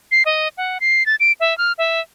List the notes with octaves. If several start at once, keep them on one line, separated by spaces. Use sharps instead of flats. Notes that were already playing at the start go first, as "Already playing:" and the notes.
C7
D#5
F#5
C7
A6
D7
E5
F6
E5